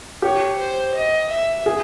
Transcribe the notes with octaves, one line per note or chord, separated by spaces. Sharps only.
G4 C#5
C5
D#5
E5
G#4